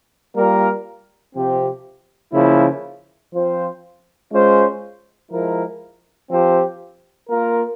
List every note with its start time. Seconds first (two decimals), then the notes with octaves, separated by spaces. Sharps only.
0.35 G3 A#3 F4 A#4
1.34 C3 F3 C4 G4
2.33 C#3 F3 A#3 E4
3.32 F3 C4 F4 C5
4.31 G#3 C#4 F4 C5
5.30 F3 G#3 E4 A#4
6.29 F3 C4 G4 C5
7.29 A#3 F4 A#4